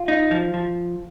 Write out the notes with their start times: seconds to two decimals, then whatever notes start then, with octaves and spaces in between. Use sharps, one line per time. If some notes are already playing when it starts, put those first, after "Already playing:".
Already playing: F4
0.08 D#4
0.31 F3
0.54 F3